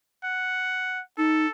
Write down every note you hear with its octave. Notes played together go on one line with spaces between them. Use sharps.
F#5
D#4 A4